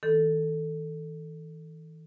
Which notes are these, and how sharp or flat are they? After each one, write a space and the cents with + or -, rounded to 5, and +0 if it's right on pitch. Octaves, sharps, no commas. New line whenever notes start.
D#3 +40 A4 +5